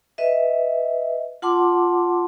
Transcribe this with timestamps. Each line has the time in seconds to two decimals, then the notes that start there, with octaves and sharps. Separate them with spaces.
0.18 B4 D#5 E5
1.42 F4 F#5 A5 C6 D6